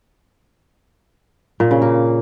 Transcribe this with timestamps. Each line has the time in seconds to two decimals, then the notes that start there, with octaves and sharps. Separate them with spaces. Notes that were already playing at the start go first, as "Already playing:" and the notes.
1.60 A#2
1.71 C#3
1.82 A#3